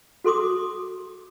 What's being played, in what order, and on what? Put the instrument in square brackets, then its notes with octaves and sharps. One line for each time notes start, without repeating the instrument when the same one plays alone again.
[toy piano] F#4 A4 C6 D6 D#6